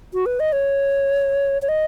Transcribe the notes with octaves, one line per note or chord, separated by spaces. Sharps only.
F#4
B4
D#5
C#5
C#5
D#5